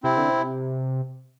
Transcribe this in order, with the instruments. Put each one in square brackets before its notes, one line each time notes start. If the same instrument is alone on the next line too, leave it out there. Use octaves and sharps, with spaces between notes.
[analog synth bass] C3 [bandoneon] C4 E4
[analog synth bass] D3
C3